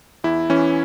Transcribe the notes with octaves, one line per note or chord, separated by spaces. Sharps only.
E2 E4
E3 C#4